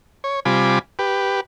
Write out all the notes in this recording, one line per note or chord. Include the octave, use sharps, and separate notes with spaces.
C#5
C3 G3 F4 G#5 B5 D6
G4 B4